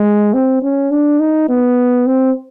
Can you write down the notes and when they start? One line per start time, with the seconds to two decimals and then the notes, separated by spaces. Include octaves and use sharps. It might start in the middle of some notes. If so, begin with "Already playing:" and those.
Already playing: G#3
0.34 C4
0.62 C#4
0.91 D4
1.20 D#4
1.49 B3
2.06 C4